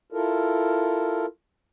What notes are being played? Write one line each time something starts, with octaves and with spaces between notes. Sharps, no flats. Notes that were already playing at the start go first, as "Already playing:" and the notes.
E4 F4 A4 A#4